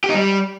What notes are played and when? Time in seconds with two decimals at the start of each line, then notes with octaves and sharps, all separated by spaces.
0.04 G4
0.09 D#4
0.14 G3